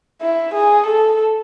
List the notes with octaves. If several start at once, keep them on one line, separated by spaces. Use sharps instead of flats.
E4
G#4
A4